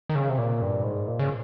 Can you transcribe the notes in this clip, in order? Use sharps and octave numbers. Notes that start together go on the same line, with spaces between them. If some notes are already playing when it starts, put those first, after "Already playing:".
D#3
C#3
C3
A#2
G2
G#2
A#2
C#3